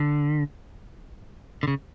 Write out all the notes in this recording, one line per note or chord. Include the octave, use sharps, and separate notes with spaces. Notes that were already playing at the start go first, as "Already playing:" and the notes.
Already playing: D3
D3
C#3